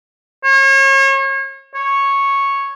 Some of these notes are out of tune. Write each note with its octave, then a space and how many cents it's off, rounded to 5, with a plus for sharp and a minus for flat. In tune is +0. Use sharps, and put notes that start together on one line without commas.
C#5 -35
C#5 -5